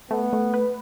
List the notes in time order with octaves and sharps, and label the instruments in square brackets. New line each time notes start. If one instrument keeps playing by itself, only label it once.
[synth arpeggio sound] A3 [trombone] B3
[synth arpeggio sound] A3
B4